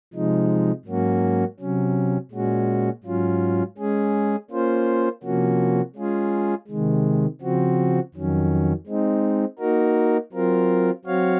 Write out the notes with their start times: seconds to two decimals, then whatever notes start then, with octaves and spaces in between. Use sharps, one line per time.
0.14 C3 F3 G#3 D#4
0.86 G#2 F#3 A#3 C#4 F#4
1.60 C3 F#3 C#4
2.32 A#2 G#3 C#4 F#4
3.04 G#2 F#3 C#4 F4
3.78 G#3 C#4 G#4
4.50 A#3 C#4 F4 C5
5.23 C3 F3 A#3 C#4 F#4
5.96 G#3 C#4 F4 G#4
6.68 C3 D#3 G#3
7.41 C#3 F3 C4 F#4
8.14 F2 D#3 F#3 C#4
8.87 G#3 C4 D#4
9.59 A#3 D#4 F#4 A#4
10.32 F#3 C4 F4 A#4
11.04 F#3 C4 F#4 C#5 F5